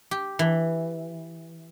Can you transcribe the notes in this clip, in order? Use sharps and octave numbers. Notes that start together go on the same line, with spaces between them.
G4
E3